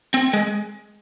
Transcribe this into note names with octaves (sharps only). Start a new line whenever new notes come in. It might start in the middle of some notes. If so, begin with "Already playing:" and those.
C4
G#3